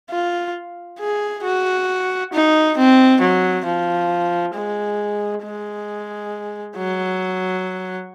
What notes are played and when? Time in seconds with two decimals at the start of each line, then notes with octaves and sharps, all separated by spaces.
0.10 F4
0.99 G#4
1.44 F#4
2.33 D#4
2.77 C4
3.21 F#3
3.65 F3
4.55 G#3
5.43 G#3
6.76 F#3